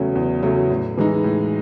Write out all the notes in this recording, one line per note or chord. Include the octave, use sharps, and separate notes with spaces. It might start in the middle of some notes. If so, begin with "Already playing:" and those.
Already playing: E2 C#3 F#3 A3 C#4
E2
C#3 F#3 A3 C#4
A2
E3 G#3 D#4
A2